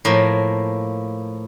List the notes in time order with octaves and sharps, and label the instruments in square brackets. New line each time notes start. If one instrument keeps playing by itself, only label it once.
[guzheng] A2 F3 A#3